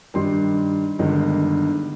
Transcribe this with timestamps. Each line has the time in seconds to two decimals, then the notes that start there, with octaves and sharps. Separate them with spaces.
0.14 G2 D#3 G3 C6
0.99 G1 G2 D#3 G#3